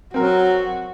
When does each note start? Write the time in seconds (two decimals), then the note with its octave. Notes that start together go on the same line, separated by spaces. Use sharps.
0.14 F#3 C4 F#4 A#4